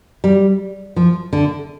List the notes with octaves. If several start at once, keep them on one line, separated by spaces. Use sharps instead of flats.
G3
F3
D3